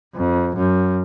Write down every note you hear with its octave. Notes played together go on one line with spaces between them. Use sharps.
F2
F#2